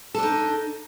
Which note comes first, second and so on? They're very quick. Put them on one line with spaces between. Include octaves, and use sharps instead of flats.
A4 D4 D#4